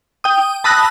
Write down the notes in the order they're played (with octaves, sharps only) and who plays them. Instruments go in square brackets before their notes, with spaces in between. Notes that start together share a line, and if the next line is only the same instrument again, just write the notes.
[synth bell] G5 D#6
A5 B5 D#6 E6 F#6 A#6